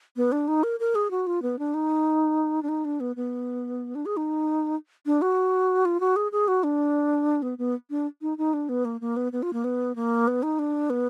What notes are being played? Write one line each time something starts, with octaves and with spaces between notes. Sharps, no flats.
B3
D4
D#4
A#4
A#4
G#4
F#4
F4
B3
D4
D#4
D4
D#4
D4
B3
B3
D4
G#4
D#4
D4
F#4
F4
F#4
G#4
G#4
F#4
D4
B3
B3
D4
D#4
D#4
D4
B3
A#3
A#3
B3
B3
F4
A#3
B3
A#3
B3
D#4
D4
B3